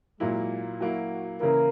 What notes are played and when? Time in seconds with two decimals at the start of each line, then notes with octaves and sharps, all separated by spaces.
0.19 A#2 F#3 G#3 A#3 E4
0.80 F#3 A#3 E4 F#4
1.41 C#3 E3 A#3 E4 A#4